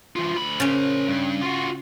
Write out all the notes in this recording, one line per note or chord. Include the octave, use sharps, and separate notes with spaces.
E3 F4
D2 B5
C#3 C#4 A#4 C5
G2
F4 F#4